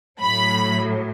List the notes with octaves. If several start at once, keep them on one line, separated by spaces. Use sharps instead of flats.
A2 F#3 B5